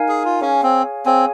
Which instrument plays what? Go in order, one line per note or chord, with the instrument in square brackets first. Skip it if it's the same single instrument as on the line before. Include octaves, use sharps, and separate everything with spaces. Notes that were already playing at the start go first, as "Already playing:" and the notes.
Already playing: [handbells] D#4 A#4 F5 G#5
[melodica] G#4
F4
[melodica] C#4 [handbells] G#4 C#5 F5 G#5
[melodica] C4
[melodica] C4 [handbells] G#4 C#5 F5 G#5